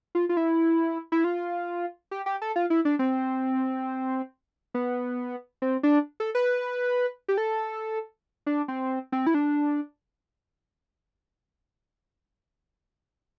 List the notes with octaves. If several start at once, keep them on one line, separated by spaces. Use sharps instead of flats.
F4
F4
E4
E4
F4
G4
G4
A4
F4
E4
D4
C4
B3
C4
D4
A4
B4
G4
A4
D4
C4
C4
E4
D4